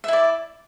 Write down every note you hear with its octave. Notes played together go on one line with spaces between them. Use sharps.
E4 D5 E5